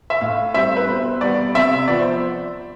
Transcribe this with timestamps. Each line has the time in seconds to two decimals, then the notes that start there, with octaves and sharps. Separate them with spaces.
0.10 E5
0.21 A2 F5
0.54 G3 C4 E5
0.76 B4
0.88 B2 C5
1.21 G3 B3 D5
1.55 C3 E5
1.88 F3 B3 D5
1.99 C5